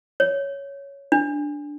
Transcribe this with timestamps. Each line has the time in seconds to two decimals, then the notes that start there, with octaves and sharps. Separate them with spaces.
0.20 C#5
1.12 D4